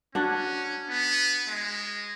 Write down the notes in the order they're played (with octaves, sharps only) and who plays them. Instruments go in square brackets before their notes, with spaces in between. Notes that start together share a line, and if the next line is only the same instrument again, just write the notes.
[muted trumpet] C#4 [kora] D4 F#4
[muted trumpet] B3
G#3